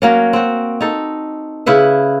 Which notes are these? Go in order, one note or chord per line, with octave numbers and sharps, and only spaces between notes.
F#3 A#3 C#4
C4 F#4
D#4 A4
C#3 E4 B4 E5